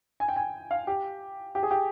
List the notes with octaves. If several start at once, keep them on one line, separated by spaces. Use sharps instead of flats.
G#5
G5
G#5
F5
G4
G4
G#4
G4